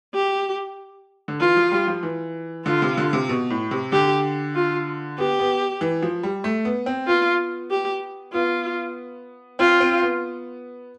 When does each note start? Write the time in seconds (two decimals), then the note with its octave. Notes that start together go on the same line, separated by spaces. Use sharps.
0.14 G4
1.28 D3
1.40 E3 F4
1.56 F3
1.72 G3
1.87 F3
2.03 E3
2.66 D3 F4
2.82 C3
2.97 D3
3.13 C3
3.29 B2
3.50 A2
3.71 C3
3.92 D3 G4
4.55 F4
5.18 B3 G4
5.39 B3
5.81 E3
6.02 F3
6.23 G3
6.44 A3
6.65 B3
6.86 C4
7.07 B3 F4
7.70 G4
8.33 B3 F4
9.59 C4 F4
9.80 C4
10.02 B3